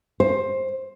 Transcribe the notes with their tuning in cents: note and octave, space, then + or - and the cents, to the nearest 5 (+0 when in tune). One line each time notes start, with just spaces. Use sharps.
C5 +15